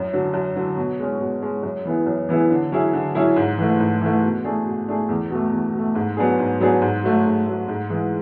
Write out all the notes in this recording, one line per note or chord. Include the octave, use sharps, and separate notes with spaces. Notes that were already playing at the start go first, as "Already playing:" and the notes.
Already playing: F#2
D3 F#3
F#2
D3 F#3
B2
G#3 C#4
B2
G#3 C#4
F#2
E3 B3 E4 G#4
F#2
E3 B3 E4 G#4
D3
F#3 C#4 E4 G#4
D3
F#3 C#4 E4 G#4
G#2
E3 A3
G#2
E3 A3
B2
A3 D4 G#4
B2
A3 D4 G#4
E2
B2 A3
E2
B2
A3
G#2
F#3 B3 D4 G#4
G#2
F#3 B3 D4 G#4
G#2
F#3 A3
G#2
F#3 A3
G#2
E3 G#3